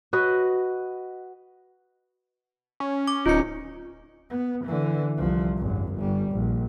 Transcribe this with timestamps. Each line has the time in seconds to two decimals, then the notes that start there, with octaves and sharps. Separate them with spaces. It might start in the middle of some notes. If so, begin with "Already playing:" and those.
0.13 F#4 B4 D#5
2.80 C#4
3.08 D6
3.26 D1 D#4 F4 C#7
4.30 B3
4.65 D3 E3
5.17 C2 F3
5.58 G#1 F#2
5.96 G1 G3
6.32 A#1